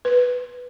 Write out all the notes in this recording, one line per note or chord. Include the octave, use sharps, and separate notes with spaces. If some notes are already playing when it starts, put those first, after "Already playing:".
B4